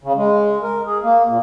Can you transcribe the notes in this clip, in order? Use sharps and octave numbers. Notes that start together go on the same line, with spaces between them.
C#3
G#3
A#4
G#4
A#3
A#2